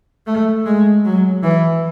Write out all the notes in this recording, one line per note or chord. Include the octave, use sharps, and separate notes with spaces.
A3
G#3
F#3
E3